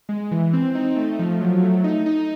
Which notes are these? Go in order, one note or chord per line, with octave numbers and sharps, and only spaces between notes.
G#3
E3
C4
D#4
A3
F3
F#3
A3
D#4
D#4